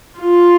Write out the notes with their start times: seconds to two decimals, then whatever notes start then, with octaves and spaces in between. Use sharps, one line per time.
0.19 F4